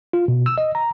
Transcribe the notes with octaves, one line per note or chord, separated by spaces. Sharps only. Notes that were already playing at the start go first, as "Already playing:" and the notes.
F4
B2
E6
D#5
A#5